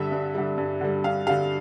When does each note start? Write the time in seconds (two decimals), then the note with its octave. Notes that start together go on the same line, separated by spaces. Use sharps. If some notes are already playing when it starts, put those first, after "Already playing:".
Already playing: G2 D3 G3 E5
0.12 G2
0.35 D3 G3
0.58 G2
0.81 D3 G3
1.04 G2 F5
1.27 D3 G3 F5